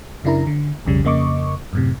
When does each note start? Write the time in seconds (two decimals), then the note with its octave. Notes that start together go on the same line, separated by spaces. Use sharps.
0.24 F#2 C#3 D4 E4 A#4 A#5
0.47 D3
0.85 B1 F2 C#3 G3
1.04 F2 C#3 A#3 D#5 C#6 D6
1.73 F#2 A2 C3